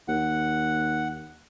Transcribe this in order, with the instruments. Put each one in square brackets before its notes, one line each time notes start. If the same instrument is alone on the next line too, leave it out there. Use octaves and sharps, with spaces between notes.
[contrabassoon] D#2 [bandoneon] F#5